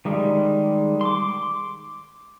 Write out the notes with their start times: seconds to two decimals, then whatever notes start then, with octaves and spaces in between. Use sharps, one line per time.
0.05 D#3 G3 G#3
1.01 C6 D6